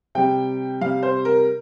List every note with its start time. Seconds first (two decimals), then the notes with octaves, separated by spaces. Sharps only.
0.15 C3 G3 G5
0.81 C3 G3 F5
1.03 C5
1.25 A#4